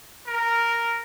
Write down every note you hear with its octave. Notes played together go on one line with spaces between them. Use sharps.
A#4